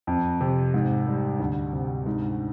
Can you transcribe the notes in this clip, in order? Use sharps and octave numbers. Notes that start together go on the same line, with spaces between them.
F2
C3
G#2
G3
D2
C3
G#2